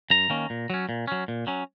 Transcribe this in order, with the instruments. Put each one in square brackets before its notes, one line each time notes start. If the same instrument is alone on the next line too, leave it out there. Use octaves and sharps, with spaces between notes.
[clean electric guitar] F#2 A#5
D#3 A#3 C#4
A#2
F#3 C#4
A#2
F#3 C#4
A#2
F#3 C#4